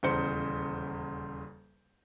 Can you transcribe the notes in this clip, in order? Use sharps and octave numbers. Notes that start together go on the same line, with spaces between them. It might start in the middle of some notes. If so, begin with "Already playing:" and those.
D#1 E2 C#3 C5 G6 C#7